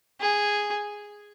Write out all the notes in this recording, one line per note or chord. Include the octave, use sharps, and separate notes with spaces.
G#4